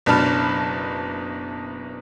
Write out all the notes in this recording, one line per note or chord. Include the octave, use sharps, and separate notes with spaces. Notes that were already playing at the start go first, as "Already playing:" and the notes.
F#1 B2 D4 A5 B5 F6